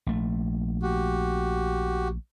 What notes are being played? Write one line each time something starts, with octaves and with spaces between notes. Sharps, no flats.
A#1 A3
F#4 G4